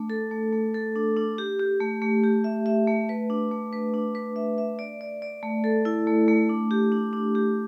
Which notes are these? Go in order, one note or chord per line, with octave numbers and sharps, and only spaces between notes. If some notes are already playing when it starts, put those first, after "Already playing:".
Already playing: A3 D4
A4
A3
A3
A4
D4
D4
G4
G4
A3
A3
G4
E5
E5
A3
B4
D4
A3
B4
D4
B4
E5
E5
D5
D5
D5
A3
A4
E4
A3
A3
D4
G4
D4
D4
G4